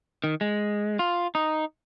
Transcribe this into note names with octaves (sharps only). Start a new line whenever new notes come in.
D#3
G#3
F4
D#4